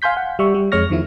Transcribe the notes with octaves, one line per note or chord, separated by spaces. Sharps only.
F5 G#5 C6 G6 B6
F#5
G3 E5 C#6
G3
F2 G#3 C#5 C#6 F6 A#6
E2 D#3 F3 E4